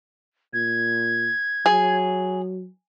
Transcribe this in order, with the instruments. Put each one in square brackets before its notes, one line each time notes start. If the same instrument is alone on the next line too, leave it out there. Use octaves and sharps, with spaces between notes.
[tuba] A#2 [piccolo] G#6
[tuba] F#3 [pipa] G#4